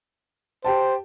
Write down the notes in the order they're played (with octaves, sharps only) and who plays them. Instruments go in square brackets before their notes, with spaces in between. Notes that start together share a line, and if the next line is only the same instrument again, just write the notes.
[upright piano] G4 G5 A5 [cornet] C5